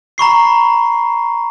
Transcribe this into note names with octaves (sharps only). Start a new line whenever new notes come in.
A#5 B5 C#6 C7